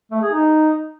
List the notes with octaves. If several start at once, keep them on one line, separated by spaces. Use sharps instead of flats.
A3
G#4
D#4